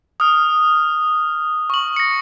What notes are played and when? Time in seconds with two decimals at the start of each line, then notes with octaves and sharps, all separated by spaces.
0.20 D#6 F6
1.70 C#6 F#7
1.96 A#6 C#7